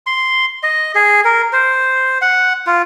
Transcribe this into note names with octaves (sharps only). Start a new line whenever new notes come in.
C6
D#5
G#4
A#4
C5
F#5
F4